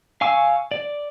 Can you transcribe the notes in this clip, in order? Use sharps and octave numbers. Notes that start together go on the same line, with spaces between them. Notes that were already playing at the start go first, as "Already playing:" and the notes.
F5 G#5 C#6 E6
D5